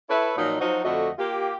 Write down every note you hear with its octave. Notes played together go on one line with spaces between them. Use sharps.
E4 A4 B4 C#5 E5
A#2 F3 F#3 D#4
F3 F#3 D#4 F#4 C5
F2 D3 A3 F#4 D#5
A#3 F4 G4